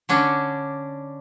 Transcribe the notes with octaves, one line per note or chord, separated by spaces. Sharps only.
D3 C#4 D4